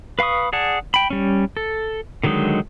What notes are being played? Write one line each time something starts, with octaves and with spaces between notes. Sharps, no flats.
B4 F5 B5 C#6 D#6
G#4 D5 F#5 A5
G5 B5
G3 C#4
A4
D3 D#3 F#3 G#3 D#4